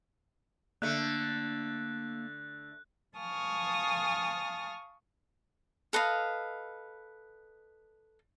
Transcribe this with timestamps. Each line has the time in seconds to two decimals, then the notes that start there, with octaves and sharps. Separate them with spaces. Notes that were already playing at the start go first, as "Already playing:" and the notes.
0.82 D3 A3 A#3 F#6
3.17 F5 G#5 A5 C#6 D#6 F6
5.93 A4 B4 D#5 F5